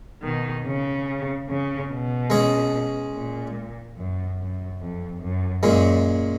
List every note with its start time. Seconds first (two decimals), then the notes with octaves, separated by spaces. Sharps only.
0.22 B2 D#3
0.65 C#3
1.47 C#3
1.89 B2
2.30 G#3 C#4 G#4
3.13 A#2
3.97 F#2
4.39 F#2
4.80 F2
5.21 F#2
5.62 F#2 A#2 G#3 C#4